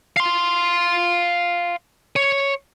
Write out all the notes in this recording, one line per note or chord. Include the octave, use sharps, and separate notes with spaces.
F5 C6
C#5